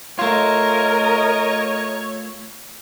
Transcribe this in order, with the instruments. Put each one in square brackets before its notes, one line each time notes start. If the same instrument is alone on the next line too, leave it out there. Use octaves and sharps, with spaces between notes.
[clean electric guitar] A3 F4 [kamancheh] A#4 D#5 [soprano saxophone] C#5